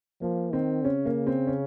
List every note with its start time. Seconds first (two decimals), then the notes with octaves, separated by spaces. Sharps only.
0.21 F3 A#3
0.52 D#3 C4
0.85 C#3 C#4
1.06 A#3
1.27 C4
1.47 C#4